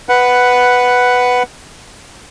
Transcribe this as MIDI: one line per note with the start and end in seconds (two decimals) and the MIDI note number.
0.09 1.43 71
0.09 1.43 78